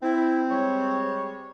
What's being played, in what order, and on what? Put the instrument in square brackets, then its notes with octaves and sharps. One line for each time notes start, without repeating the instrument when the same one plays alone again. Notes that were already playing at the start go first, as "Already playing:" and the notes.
[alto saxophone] C4 [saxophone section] E4
[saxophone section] G3 G#3 C#5